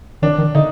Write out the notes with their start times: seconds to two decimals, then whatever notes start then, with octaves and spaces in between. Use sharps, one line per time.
0.22 D#3 D4
0.38 D#3
0.55 D3 D#4